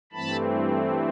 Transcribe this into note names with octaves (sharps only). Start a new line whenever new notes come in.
G2 E3 A3 C4 A5 B5